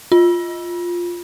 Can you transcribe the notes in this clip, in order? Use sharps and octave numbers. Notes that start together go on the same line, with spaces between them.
F4